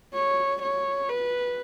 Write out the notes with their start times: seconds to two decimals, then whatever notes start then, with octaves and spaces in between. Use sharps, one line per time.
0.14 C#5
0.62 C#5
1.09 B4